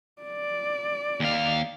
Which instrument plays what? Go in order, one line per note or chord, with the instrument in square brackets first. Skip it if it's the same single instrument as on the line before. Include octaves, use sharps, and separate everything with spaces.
[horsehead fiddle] D5
[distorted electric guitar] D#2 F5